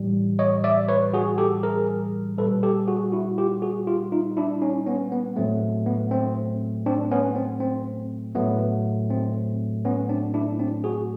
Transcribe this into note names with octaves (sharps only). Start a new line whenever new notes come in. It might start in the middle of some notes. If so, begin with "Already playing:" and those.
Already playing: A2 E3 G3
C#5 D#5
D5 E5
B4 C#5
F#4 G#4
G4 A4
G#4 A#4
A#2 G3 A4 B4
G4 A4
F#4 G#4
E4 F#4
F4 G4
F#4 G#4
F4 G4
D#4 F4
D4 E4
C#4 D#4
B3 C#4
B3
A2 F#3 A3 C4
B3
C4
C4 D4
B3 C#4
C4
C4
A2 F#3 A3 B3
C4
B3 C#4
C4 D4
D4 E4
C4 D4
F#4 G#4